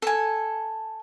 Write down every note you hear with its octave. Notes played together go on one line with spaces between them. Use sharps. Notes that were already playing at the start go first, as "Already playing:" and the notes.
A4 G#5